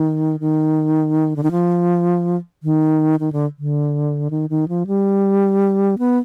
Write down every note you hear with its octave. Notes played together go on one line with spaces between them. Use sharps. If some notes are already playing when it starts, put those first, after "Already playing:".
Already playing: D#3
D#3
D3
D#3
F3
D#3
D#3
D3
D3
D#3
D#3
F3
G3
B3